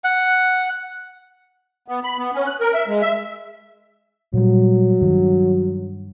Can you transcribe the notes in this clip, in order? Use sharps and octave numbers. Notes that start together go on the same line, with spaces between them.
F#5
B3
B5
B3
C#4
F#6
A#4
E5
G#3
E5
A#2 F#3 G3
G2 D#3